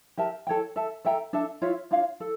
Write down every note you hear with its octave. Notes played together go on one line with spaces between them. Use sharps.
G4 A#4 E5 A5
A4 C#5 G5
A4 E5 A5
A4 E5 G5 A#5
D4 A4 E5 A5
F4 C#5 E5
D4 F4 C#5 F5
A4